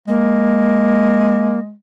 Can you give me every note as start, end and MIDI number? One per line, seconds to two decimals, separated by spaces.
0.08 1.73 56
0.08 1.59 58